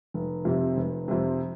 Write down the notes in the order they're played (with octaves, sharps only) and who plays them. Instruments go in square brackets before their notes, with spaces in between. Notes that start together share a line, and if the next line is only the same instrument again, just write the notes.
[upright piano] F1
F2 C3
F1
F2 C3